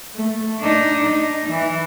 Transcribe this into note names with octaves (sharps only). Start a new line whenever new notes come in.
A3
D4 D#4
D#4
E3